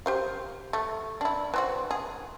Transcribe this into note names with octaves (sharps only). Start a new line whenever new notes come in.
G4 C5 F5
A3
D4 E4
E3 C4 F#4
G#4